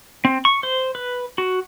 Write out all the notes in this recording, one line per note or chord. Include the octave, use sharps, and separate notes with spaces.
C4
C#6
C5
B4
F#4